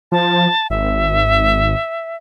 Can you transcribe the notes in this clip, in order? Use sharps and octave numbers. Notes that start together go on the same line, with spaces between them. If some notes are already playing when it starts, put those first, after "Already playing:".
F3 A5
G#1 E5